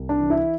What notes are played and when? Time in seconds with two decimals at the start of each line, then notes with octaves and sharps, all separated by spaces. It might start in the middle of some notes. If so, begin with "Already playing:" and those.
Already playing: C2
0.09 D4
0.20 E3
0.30 E4